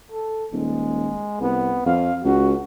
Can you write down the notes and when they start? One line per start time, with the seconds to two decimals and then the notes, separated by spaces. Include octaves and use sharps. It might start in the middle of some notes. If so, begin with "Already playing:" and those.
0.12 A4
0.52 D#1 G#3
1.41 C2 B3
1.86 F2 F5
2.24 C#2 F#4